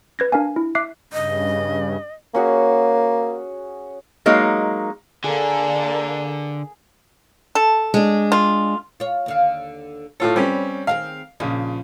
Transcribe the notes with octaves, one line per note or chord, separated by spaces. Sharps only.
B4 G#6 A#6
D4 A#4 F5 G#5
E4
E5 D6 F#6 C7
G2 C#3 D#5
A#3 C#4 F#4 G#4
F#3 G#3 A#3 D#4
D3 A#3 G#4 A4 D5
A4
G#3 D4
F4
F4 C#5
D#2 D3 F5
A2 F4 A4 C#5
G3 C4 C#4 B4
D#3 C4 G#4 F5
A#1 C#3 F3